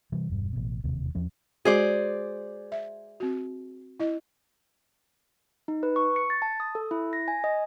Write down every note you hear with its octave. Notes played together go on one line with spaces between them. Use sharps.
C3 E3 G3
E1 G2
A1 B2
E1 D#2 C3
E2 F3 C#4
G#3 F#4 G#4 C5 D5
E5
C4 F#4
E4 D#5
D#4
B4
C#6
C#7
A6
A5
D#6
A4
E4
A#6
G#5
D#5